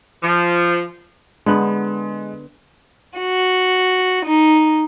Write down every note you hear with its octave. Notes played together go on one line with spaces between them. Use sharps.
F3
D3 G#3 B3
F#4
D#4